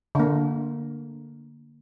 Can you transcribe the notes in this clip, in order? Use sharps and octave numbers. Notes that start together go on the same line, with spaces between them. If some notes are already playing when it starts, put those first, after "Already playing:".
D3 A#3